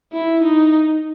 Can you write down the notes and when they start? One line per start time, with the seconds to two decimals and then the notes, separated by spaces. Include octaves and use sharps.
0.13 E4
0.44 D#4